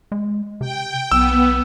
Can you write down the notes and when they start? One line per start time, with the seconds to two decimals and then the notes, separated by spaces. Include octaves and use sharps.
0.12 G#3
0.61 C3 G5
1.12 B1 B3 E6